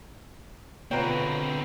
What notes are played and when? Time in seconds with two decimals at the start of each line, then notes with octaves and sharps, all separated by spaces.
0.91 B2 D3 C4 F4 B4 C#5 G5 A#5